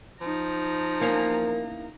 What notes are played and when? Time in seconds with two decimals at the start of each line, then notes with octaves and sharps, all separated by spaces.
0.21 F3 D#4 A#5
1.01 E2 A#3 C#4 A#4